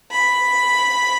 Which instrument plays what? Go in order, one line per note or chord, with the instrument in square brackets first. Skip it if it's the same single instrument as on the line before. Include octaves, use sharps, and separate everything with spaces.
[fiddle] B5